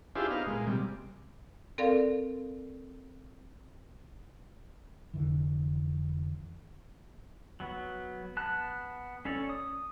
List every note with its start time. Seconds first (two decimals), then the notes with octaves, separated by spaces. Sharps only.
0.15 D4 E4 F4 G4 G#4 C5
0.31 B3 D#4 F5
0.46 A#2 G#3
0.67 C3 G3
1.78 C4 A4 A#4 D5 F5
5.14 F1 D3 E3
7.60 F#3 B3
8.37 B3 A5 F#6
9.25 C#4 A4 C#5 D5
9.49 D#6